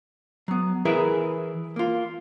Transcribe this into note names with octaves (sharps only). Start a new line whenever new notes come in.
F#3 B3
E3 E4 G#4 A#4 B4 E5
A#3 F4